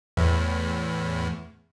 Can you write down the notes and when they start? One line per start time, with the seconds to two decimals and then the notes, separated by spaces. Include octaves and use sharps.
0.17 E2 A2